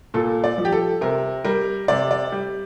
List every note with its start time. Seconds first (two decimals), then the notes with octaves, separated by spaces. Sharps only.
0.14 A#2 A4
0.44 D5
0.58 F3
0.65 G4
0.73 A4
1.01 C3 A#4
1.45 G3 A#4
1.88 C3 D5
2.11 D5
2.32 G3